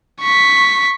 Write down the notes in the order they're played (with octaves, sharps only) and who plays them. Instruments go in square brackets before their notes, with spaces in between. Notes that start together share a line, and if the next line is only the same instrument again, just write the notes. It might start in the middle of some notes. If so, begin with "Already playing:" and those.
[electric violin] C#6 B6